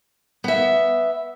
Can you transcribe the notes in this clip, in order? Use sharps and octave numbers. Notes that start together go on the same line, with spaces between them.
B3 E5